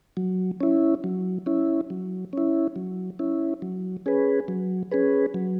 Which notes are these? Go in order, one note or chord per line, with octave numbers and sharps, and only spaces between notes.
F#3
C#4 E4
F#3
C#4 E4
F#3
C#4 E4
F#3
C#4 E4
F#3
C#4 G#4 B4
F#3
C#4 G#4 B4
F#3